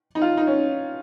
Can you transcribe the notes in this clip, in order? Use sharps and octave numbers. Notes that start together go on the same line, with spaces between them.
D#4
F4
D#4
C#4